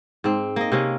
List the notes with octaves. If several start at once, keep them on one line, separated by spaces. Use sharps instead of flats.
G#2 C4
A#3 D#5
C3 A#3 C#4